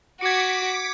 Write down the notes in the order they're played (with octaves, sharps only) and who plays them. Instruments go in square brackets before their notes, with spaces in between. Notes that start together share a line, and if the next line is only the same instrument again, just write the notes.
[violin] F#4 [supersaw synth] D6 B6 [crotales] G#6 C#7